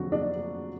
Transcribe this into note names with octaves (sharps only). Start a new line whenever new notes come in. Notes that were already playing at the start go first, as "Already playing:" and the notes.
Already playing: F2 D3 F#3 F#4
D4